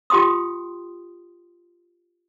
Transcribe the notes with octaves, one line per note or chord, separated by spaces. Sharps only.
F4 G4 G5 C6 D#6